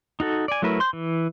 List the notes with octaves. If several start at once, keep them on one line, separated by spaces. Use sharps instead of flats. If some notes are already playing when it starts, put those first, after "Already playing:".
D#4 F#4 A4
D5 G#5
F#3 A3 E4 A#4 B4
C6 G6
E3